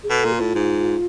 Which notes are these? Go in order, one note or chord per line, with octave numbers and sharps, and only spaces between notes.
G#4
B2 A4
A#2
F4
A2
G#2